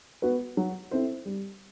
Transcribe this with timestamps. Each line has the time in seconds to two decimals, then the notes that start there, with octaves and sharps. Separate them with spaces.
0.22 B3 F#4 B4
0.57 F#3
0.91 C4 E4 A4 C5
1.26 G3